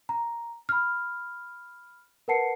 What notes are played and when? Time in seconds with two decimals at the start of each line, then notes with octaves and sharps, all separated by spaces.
0.09 A#5
0.69 B5 F6
2.28 A#4 B4 F#5 A5 C7 C#7